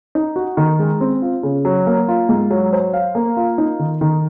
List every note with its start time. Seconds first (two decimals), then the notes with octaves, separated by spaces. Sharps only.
0.15 D#4
0.36 F#4
0.57 D#3
0.79 G#3
1.01 C4
1.22 F4
1.43 C#3
1.65 F#3
1.86 A#3
2.08 F4
2.29 G#2
2.51 F#3
2.73 C5
2.93 F5
3.15 A#3
3.37 F4
3.58 D#4
3.79 D#3
4.01 D#3